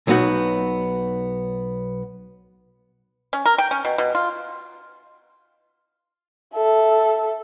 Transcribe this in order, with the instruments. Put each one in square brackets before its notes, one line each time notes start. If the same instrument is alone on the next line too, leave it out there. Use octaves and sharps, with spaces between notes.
[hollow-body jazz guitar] B1 F#3 B3 D#4 F#4 F#5
[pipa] C#4
A#4
G5
C#4
B2
B2
F4
[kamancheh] A4 E5